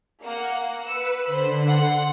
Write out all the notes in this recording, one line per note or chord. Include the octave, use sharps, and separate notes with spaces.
A#3 F#5
B4 E6 C#7
D3 C5 B5
F#5 C6